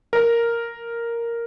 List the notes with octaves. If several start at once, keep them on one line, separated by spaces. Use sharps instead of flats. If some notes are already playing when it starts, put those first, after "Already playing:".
A#4